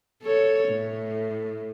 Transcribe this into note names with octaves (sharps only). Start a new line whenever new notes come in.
A4 C#5
A2